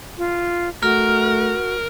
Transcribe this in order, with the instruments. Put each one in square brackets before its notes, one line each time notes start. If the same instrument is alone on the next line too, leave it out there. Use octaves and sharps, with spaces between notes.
[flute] F4
[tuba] A3 [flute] F#4 [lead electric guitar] A#4 [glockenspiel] F6